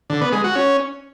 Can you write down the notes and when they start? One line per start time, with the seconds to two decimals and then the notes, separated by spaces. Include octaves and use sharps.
0.10 D3
0.21 B3
0.33 G#3
0.44 F#4
0.55 C#4